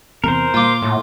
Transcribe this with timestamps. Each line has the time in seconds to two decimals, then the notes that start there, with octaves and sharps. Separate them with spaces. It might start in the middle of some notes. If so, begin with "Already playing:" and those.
0.24 E2 C3 A#4 C5
0.54 A#2 F4 D6
0.82 A2